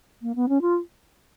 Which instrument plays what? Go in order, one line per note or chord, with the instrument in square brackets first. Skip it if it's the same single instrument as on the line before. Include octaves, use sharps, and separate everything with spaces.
[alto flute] A#3
B3
C#4
F4